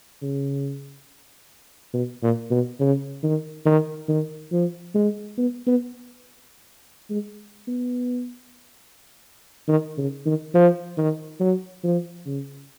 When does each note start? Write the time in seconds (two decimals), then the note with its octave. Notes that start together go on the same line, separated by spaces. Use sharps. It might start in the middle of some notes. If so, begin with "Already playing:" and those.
0.22 C#3
1.94 B2
2.22 A#2
2.51 B2
2.80 C#3
3.23 D#3
3.66 D#3
4.09 D#3
4.51 F3
4.95 G#3
5.38 B3
5.67 B3
7.10 G#3
7.68 B3
9.68 D#3
9.98 C#3
10.26 D#3
10.54 F3
10.98 D#3
11.40 F#3
11.84 F3
12.26 C#3